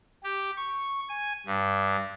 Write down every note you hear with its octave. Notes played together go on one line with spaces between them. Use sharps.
G4
C#6
G#5
G2